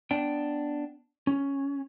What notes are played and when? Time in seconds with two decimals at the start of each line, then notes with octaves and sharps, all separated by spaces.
0.11 B3 D4 G5
1.27 C#4